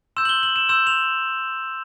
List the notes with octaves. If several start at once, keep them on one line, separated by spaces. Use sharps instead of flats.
C6 E6 G6 E7
F#7
G7
F#7
E7
C6 E6 G6 E7
F7